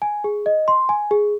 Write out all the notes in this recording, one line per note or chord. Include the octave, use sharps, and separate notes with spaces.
G#5
G#4
D#5
C6
G#5
G#4